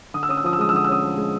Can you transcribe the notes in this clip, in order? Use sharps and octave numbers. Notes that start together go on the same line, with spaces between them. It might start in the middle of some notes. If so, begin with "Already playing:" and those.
D3 D#6
E6
C#4 D#6
E6
F3 D#6
E6
G#3 D#6
E6
D3 D#6
E6
C#4 D#6
F3
G#3